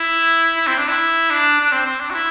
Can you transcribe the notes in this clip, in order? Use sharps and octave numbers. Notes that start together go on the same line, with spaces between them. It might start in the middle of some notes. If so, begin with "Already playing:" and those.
Already playing: E4
E4
C4
D4
E4
D4
D4
C4
C4
D4
F#4
E4